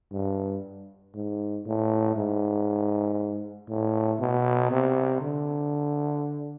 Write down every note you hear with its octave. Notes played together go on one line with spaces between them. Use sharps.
G2
G#2
A2
G#2
A2
B2
C3
D3